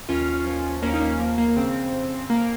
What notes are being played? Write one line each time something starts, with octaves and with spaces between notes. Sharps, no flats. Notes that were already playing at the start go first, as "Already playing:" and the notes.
D#2 C#4 F4
F3
D#2 A#3 C#4
D#4
A#3 C#4
F3 A#3
A#3
A#3
C#3 C4
F2
F2 A#3